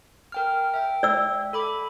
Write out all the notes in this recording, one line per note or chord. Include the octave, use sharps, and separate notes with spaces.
A#4 G5 F6
E5 G5
D5 E6
A4 B5 D6